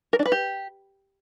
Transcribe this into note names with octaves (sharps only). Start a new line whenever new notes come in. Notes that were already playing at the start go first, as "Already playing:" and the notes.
A#4
D4
B4
G4